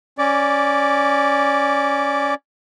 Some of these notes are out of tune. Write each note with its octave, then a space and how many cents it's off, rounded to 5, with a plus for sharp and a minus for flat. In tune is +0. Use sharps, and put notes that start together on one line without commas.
C#4 +0 D5 +0 D6 -20